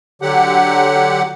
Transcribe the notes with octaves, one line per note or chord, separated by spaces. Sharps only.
D3 F#3 G4 F#5